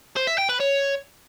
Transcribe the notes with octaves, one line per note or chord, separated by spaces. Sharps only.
C5
E5
G5
B4
C#5